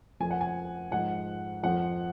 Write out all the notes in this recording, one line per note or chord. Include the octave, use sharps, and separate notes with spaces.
F2 F3 G#5
F#5
G#5
G#2 F3 F#5
F2 F3 F#5